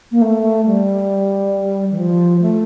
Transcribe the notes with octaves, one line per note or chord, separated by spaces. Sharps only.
A#3
A3
G3
E3
F3
A3